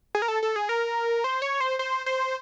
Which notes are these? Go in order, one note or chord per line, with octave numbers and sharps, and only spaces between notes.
G#4
A#4
A4
A4
G#4
A#4
C5
C#5
C5
C5
C5